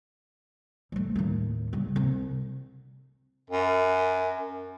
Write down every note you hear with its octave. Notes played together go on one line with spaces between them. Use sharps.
G3 A3
D#2 A2
C#3 G3
C2
F#2